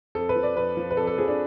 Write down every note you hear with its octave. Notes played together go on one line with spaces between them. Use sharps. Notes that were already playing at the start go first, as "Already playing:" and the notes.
F2 A4
B4
F3
D5
F2 B4
F3
B4
F2 A4
A4
F3 G#4
D4